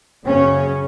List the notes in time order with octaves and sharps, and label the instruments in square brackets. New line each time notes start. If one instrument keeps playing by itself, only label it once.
[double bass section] F#2 C#3 C#4